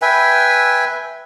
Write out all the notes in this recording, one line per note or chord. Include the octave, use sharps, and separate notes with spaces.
B4 E5 G5 G#5